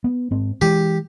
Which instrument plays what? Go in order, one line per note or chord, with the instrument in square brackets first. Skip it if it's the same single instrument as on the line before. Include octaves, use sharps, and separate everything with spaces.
[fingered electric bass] B3
G#2 C4
[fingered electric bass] E3 G#3 [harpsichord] G4